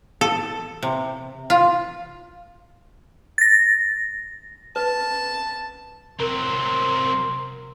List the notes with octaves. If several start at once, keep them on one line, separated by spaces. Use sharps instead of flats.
A4
C3
F4
A6 A#6
B4 A5
C3 F#3 C4 A#4 A#5 C6